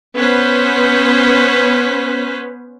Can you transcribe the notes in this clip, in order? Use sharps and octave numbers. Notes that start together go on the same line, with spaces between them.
B3 C#4 B4 C5